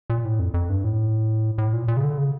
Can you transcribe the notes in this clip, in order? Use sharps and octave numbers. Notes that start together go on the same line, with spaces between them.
A#2
A2
F2
F2
G2
A2
A2
A#2
A#2
C#3
D3
C#3